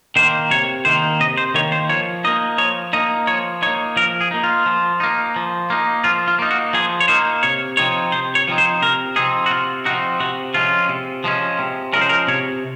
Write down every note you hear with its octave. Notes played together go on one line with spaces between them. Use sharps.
D#3 A#3 C5
C3 C#5
D#3 A#3 C5
C3 D#5
C5
D#3 A#3 C#5
C5
F3 C#5
A#3 D#4 D#5
F3 C#5
A#3 D#4 D#5
F3 C#5
A#3 D#4 C#5
F3 A#4
G#4
A#3 D#4
F4
F3
A#3 D#4
F3
A#3 D#4
F3 F4
F4
A#3 D#4
F#4
F3 G#4
C#5
A#3 D#4 C5
C3 C#5
F3 C4 D#4 C#5
C3 C5
C#5
F3 C4 D#4
C5
C3 A#4
F3 C4 D#4 G#4
F#4
C3 F4
F3 C4 D#4 F#4
C3 F#4
F3 G#3 C#4 F4
C3
F3 G#3 C#4
C3
F3 G#3 C#4 A#4
C5
A#4
C3 C#5